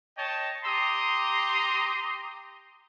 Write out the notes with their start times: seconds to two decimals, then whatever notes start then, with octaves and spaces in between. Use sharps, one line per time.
0.17 C#5 D#5 G5 A5
0.65 G4 A#5 C6 D#6